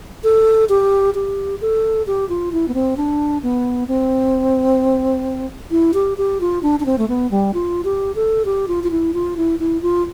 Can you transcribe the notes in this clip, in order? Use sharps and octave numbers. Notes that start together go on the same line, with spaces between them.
A4
G4
G4
A4
G4
F4
E4
B3
C4
D4
B3
C4
E4
G4
G4
F4
D4
D4
C4
A3
B3
G3
F4
G4
A4
G4
F4
F4
E4
F4
E4
E4
F4